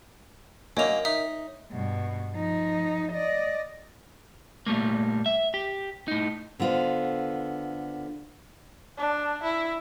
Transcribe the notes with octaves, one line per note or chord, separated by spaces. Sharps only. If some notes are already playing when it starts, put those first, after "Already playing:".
F#2 A#3 A#4 C#5 D#5 G5 F7
D#4 E5
G2 B2
F3 D#4
D5 D#5
A#2 G3 A3 A#3
E5
G4
A2 D#4
D3 B3 F4 C5
D4
E4